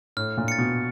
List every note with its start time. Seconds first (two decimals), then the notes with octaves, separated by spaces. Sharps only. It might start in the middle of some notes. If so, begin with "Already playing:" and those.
0.17 A2 F6
0.37 A#2
0.48 A6 C#7
0.58 B2